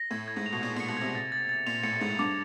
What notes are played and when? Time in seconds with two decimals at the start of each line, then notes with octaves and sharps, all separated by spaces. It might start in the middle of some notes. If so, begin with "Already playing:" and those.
Already playing: A#6
0.11 A2 G#6
0.28 G#6
0.36 G#2
0.46 F7
0.52 B2
0.62 A#2 G#6
0.76 A#2 C#7
0.88 B2
0.97 C3 G#6
1.15 A6
1.32 A6
1.49 A6
1.66 A#2 F7
1.83 A2 C#7
2.01 G#2 A6
2.19 G2 D6